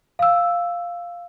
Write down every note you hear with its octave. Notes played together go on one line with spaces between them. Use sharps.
F5 E6